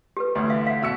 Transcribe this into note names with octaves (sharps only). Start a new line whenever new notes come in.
G4 A4 B4
A1 D2 G4
E5 F5
F5 F#5
B2 E6 C#7